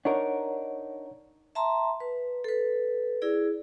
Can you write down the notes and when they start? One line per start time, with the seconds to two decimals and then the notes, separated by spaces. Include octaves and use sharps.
0.05 D4 D#4 A#4 C#5 F#5
1.55 E5 A5 A#5 C6
2.00 B4
2.44 A4 B4
3.22 E4 G#4 D5